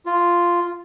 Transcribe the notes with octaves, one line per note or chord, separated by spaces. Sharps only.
F4